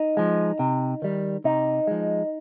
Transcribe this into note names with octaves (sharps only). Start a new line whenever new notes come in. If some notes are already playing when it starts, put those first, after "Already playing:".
Already playing: D#4
F3 G#3
C3
D#3 G3
C3 D#4
F3 G#3